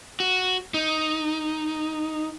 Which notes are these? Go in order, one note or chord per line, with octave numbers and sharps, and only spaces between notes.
F#4
D#4